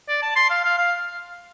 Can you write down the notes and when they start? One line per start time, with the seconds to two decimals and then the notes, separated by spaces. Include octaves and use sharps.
0.09 D5
0.22 A5
0.36 C6
0.50 F5
0.64 F5
0.78 F5